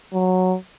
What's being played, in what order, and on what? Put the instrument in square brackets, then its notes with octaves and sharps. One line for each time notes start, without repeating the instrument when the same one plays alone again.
[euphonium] F#3